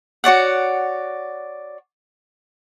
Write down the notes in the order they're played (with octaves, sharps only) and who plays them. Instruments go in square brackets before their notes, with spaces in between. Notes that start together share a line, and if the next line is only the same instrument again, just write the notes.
[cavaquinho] F#4 C#5 D5 F#5